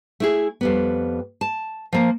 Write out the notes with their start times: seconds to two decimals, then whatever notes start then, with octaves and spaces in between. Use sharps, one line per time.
0.20 A3 E4 G#4
0.61 F2 G3 B3
1.41 A5
1.93 F3 A#3